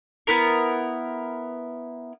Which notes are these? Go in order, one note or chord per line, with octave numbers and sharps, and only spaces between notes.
B3 E4 A#4